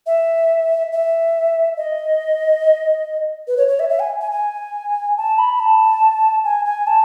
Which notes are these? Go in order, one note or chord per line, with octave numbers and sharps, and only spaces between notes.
E5
E5
D#5
B4
C#5
C#5
E5
E5
G#5
G#5
G#5
A5
B5
A5
G#5
G#5
A5